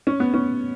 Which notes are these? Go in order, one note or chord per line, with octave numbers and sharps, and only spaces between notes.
C#4
B3
C#4